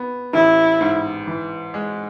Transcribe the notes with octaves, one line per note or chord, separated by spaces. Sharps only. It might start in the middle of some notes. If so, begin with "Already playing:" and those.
Already playing: B3
A1 E4
G#2
E3
G#3